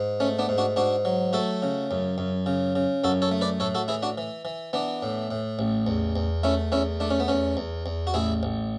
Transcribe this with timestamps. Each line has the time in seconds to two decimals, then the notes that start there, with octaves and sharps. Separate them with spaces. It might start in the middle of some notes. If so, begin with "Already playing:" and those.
Already playing: G#2
0.20 A3 C#4
0.39 B3 D4
0.49 G#2
0.58 D4 F#4
0.76 G#2 D4 F#4
1.05 F#3
1.33 A3 F#4 A4
1.62 C#3
1.91 F#2
2.18 F#2
2.46 C#3
2.76 C#3
3.04 F#2 F#4 A4
3.22 A4 C#5
3.31 A3
3.41 B4 D5
3.60 A2 A4 C#5
3.75 F#4 A4
3.88 E3 E4 G#4
4.03 D4 F#4
4.18 E3
4.45 E3
4.73 E3 B3 D4
5.02 A2
5.31 A2
5.59 A1
5.87 E2
6.16 E2
6.43 A3 C#4 E4
6.72 E2 C#4 E4
7.00 A3 D4
7.10 C#4
7.20 B3
7.28 E2 C#4
7.57 E2
7.86 E2
8.07 F#4
8.14 A1 E4 G#4
8.43 A1